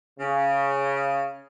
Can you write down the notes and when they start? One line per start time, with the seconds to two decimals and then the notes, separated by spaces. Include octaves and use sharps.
0.20 C#3